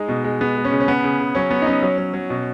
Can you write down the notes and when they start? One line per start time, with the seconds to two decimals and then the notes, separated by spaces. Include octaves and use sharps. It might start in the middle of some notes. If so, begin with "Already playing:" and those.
Already playing: G#3 D#4
0.09 B2
0.24 G#3
0.41 G#3 B3
0.57 G#3
0.64 C#4
0.72 C#3
0.80 C#4
0.88 C#3 B3
1.04 C#3
1.19 C#3
1.35 F#3 C#4
1.50 F#3 B3
1.62 D#4
1.66 F#3 C#4
1.83 F#3
1.98 F#3
2.14 F#3
2.30 B2